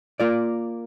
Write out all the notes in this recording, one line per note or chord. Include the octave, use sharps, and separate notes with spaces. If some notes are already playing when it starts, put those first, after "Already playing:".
A#3 F4 A#4 D5